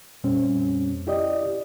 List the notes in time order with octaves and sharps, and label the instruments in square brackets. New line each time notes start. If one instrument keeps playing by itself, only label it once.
[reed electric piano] F2 A#2 G3 C4 C#4
E4 G4 D5 D#5